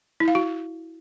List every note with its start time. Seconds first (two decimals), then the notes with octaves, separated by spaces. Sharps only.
0.20 E4
0.28 F5
0.35 F#4